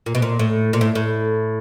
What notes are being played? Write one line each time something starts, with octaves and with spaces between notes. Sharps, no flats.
A#2
B2
A#2
A2
A#2
A2
A2